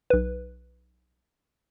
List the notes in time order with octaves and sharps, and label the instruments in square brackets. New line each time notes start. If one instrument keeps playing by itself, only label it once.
[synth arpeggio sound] B1 B4